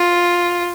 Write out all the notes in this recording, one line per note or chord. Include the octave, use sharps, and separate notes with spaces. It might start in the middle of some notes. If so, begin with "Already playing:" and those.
Already playing: F4